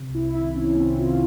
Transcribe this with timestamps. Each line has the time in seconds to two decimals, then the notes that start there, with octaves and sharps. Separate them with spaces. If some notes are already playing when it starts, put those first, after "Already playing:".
Already playing: C3
0.09 C2
0.14 E4
0.24 C2
0.35 E4
0.40 D#3
0.56 C3 C#4
0.72 C2
0.77 C4
0.88 C2
0.98 F4
1.04 D#3